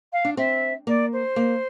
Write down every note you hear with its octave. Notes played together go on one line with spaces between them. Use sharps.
F5
D4
C4 E5
A#3 D5
C5
A#3